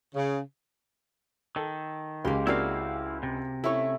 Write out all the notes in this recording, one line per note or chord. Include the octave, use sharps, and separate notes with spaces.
C#3
D#3 A4
C#2 G#3 A#3 G4 C6
A#3 C4 D4 E4 F#4 D5 F5
C3
A3 C#4 E4 C#5 C#6